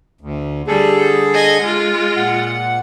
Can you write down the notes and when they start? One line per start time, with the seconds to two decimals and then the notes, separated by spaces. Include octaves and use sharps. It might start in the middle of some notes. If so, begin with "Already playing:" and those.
0.21 D2
0.68 D3 G3 G#4 A4
1.34 D#5 G#5
1.63 G#3 F4
2.16 A#2 F#5